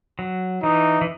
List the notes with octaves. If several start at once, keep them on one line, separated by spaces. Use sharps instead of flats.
F#3
E3 D#4
E3